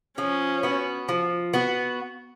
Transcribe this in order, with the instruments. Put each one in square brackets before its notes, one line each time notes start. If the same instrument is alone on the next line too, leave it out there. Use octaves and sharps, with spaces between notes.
[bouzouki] F3 [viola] C#4
[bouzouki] B3 F#4
F3
B3 F#4